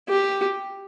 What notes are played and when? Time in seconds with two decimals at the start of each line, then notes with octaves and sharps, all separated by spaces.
0.09 G4